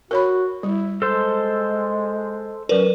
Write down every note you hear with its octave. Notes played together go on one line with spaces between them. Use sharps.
F#4 A#4 C#5 B5
G3 E4
G#3 A4 C5
F#3 C#4 A#4 B4 D5